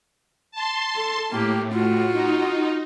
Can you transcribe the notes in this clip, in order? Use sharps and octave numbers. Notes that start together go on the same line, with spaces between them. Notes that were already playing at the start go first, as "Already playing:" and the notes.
A5 C6
A4
A2 A#3 G4
F4 F#4
D#4